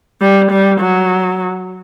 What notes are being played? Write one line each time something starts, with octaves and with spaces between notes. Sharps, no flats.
G3
G3
F#3